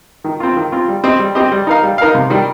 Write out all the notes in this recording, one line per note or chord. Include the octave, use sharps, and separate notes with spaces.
D#3
C4 F4
D#3
C4 F4
G3
C4 G4 D#5
G3
C4 G4 D#5
G3
D#4 A#4 F5
G3
D#4 A#4 F5
C3
D#3 G3